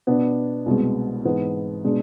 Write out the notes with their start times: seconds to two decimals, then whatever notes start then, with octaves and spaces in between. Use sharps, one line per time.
0.07 B2 B3 D4
0.66 C2 B2 G#3
1.25 G#2 E3 B3
1.84 B2 G#3 D4